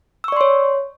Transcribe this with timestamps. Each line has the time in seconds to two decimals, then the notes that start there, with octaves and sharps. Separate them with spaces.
0.24 E6
0.28 C#6
0.32 D5
0.37 C6
0.41 C#5